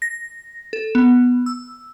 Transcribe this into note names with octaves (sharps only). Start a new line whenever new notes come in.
A#6
A4
B3
E6